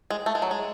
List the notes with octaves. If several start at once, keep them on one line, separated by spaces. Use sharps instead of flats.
G#3
A3
G#3
F#3
G#3